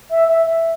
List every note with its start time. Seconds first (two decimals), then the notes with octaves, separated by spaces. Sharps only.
0.10 E5
0.28 E5
0.46 E5